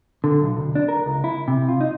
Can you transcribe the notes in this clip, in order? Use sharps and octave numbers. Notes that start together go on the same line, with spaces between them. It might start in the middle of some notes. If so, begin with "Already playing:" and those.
D3
B1
D2
D4
A#4
C#2
E4
C3
F4
D#4